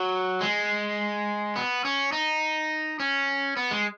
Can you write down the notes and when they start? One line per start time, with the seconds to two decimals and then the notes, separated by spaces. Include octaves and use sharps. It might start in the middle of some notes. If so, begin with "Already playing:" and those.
Already playing: F#3
0.41 G#3
1.56 B3
1.85 C#4
2.12 D#4
3.00 C#4
3.57 B3
3.71 G#3